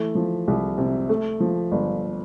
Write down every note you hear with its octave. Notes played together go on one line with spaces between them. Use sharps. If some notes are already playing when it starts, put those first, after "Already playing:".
Already playing: E3 A3
F3
C2
C3
A3
F3
G1